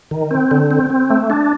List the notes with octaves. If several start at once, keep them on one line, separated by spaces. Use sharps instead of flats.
D#3
C4
D3
C4
C4
A3
D4